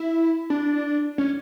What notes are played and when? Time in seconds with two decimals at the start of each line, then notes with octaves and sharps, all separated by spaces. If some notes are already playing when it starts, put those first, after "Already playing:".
Already playing: E4
0.50 D4
1.18 C#4